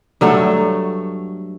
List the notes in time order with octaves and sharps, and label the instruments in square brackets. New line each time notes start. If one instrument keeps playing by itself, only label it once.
[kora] G2 F#3 A3 A4